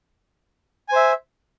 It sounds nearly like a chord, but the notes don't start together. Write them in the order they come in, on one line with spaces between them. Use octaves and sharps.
G#5 C5 E5